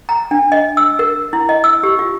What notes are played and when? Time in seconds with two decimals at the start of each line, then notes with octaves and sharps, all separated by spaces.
0.09 A#5
0.31 D4
0.52 D#5
0.77 E6
0.99 A#4
1.33 E4
1.49 D#5
1.64 E6
1.83 G4
1.99 F4